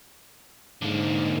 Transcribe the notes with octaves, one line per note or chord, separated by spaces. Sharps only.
G#2 D3 A#3